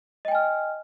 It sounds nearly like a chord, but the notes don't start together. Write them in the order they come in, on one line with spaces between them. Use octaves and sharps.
D#5 G5 G#5 F6